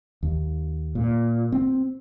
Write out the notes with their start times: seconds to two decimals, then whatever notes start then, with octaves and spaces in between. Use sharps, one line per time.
0.23 D#2
0.95 A#2
1.52 C4